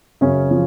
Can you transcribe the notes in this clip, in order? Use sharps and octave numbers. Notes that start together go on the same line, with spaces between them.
F#2 C#3 C#4
F3